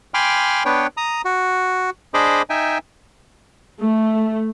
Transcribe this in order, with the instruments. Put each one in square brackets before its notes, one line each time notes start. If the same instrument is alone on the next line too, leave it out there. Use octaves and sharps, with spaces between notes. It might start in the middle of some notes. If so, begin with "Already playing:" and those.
[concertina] G5 G#5 B5 C6 D6 F6
B3 D4 B4 C#5 G5
A#5 D#6
F#4
D4 G#4 C5 D#5 B5 D6
D#4 E5 G5 G#5
[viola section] A3